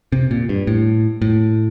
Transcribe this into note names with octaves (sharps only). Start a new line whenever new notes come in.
C3
A#2
G2
A2
A2